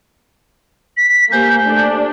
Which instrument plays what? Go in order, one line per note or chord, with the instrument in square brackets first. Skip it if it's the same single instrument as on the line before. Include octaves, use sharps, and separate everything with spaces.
[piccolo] B6
[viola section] A#3 [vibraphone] G4 C5 G#5 [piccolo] G6
[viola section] A3 D4